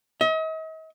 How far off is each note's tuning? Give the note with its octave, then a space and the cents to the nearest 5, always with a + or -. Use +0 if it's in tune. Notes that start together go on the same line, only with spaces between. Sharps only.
D#5 +40